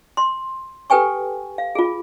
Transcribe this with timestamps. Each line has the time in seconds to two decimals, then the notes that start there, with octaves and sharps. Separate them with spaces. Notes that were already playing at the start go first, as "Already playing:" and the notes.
0.17 C6
0.90 G4 A4 B4 G5 G#5 C#6
1.58 F5
1.75 F4 G#4